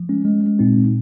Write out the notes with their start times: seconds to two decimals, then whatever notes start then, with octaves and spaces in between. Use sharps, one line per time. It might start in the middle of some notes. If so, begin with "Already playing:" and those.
Already playing: F3
0.09 G#3 C#4
0.25 G#3
0.43 G#3
0.59 A#2 C4 D#4
0.77 A#2